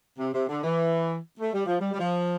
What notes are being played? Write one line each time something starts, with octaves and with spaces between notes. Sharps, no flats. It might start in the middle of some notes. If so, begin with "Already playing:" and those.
C3
C3
D3
E3
A3
G3
F3
G3
G3
F3